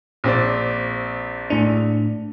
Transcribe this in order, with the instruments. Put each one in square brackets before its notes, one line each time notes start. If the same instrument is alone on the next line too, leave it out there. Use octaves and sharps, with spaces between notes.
[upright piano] A#1 C4 D5
[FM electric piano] A2 D4